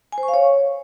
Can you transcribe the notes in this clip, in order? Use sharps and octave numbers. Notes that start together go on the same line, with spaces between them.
G#5
C5
C#6
F5
C#5